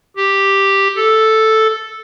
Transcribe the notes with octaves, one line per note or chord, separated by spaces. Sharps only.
G4
A4